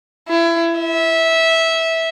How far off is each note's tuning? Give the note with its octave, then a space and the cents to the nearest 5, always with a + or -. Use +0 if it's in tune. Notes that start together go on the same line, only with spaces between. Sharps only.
E4 +25
E5 -15